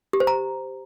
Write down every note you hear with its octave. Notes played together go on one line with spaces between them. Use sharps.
G4
C5
A#5